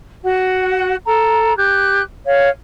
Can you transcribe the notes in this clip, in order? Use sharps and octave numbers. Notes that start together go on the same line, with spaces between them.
F#4 F#5
A4 A#5
G4 F#6
C#5 F5